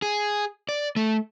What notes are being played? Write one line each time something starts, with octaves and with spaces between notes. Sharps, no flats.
G#4
D5
A3